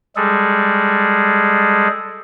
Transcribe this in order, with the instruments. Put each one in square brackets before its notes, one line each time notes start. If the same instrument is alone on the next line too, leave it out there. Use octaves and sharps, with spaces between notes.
[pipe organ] G3 G#3 G#4 A4